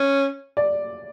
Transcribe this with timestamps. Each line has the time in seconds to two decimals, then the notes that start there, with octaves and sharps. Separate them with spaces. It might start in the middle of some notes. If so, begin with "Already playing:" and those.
Already playing: C#4
0.57 D5